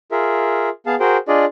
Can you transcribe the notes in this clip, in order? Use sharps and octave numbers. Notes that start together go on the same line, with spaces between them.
F4 G#4 A#4 E5
B3 G#4 F5 A5
F#4 G#4 A#4 C5 G5
D4 F4 G#4 D5 D#5